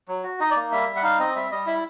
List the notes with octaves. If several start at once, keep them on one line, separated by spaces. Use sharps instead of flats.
F#3
F#4
D#4 D#5
D5
A#3
G3 E5
G3
F#5
D#4 F5
C4 D#5
G3 E5
G3 D#5
E4 E5